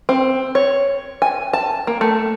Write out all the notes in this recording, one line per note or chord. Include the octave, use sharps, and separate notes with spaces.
C4
C#5
G#5
A5
A#3
A3